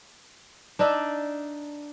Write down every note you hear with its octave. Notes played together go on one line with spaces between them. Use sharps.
D4 D#4 D5 E5